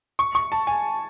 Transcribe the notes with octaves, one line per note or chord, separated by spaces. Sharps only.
C#6
C#6
A5
G#5